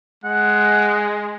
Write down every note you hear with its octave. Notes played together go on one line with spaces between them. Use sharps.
G#3 F#5